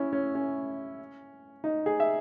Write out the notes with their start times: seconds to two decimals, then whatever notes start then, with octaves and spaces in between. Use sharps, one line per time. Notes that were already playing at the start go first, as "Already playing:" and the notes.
Already playing: C#4 E4
0.13 C#4
0.35 C#4
1.64 D#4
1.86 G#4
2.00 E5